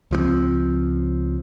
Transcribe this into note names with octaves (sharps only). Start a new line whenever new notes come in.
C#2 F3 G3 C4